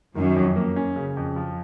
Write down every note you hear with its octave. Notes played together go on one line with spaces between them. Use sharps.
F#2 D#3
F2
A#3
C#4
C#3
F2
F3